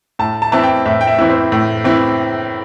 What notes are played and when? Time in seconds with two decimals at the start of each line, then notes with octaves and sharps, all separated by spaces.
0.19 A2 A5
0.42 A5
0.52 E3 C4 E4 A5
0.63 G5
0.86 A2 E5
1.01 G5
1.07 E5
1.19 E3 C4 E4
1.29 C5
1.52 A2
1.84 E3 C4 E4